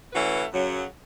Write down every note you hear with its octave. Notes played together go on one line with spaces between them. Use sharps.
E3 A3 C#4 F#4 B4
F#2 C#3 F#3